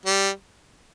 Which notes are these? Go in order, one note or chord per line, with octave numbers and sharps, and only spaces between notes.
G3